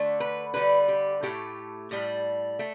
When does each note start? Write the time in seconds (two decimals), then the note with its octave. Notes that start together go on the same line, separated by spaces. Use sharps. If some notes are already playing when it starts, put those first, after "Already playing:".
Already playing: D3 A3
0.20 B4
0.54 D3 G3 B4
0.88 G4
1.23 A2 A3 G4
1.91 A2 G3
2.59 A3